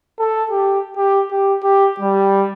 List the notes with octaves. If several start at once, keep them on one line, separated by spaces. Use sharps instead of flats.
A4
G4
G4
G4
G4
G3